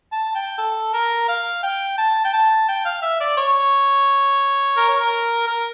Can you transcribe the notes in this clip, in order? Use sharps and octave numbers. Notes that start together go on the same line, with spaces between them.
A5
G5
A4
A#4
F5
G5
A5
G5
A5
G5
F5
E5
D5
C#5
A#4
C#5
A#4
A#4